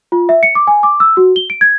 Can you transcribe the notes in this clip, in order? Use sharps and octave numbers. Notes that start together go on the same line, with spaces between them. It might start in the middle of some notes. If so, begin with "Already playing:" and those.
F4
E5
C#7
D6
G#5
D6
E6
F#4
G7
D7
G#6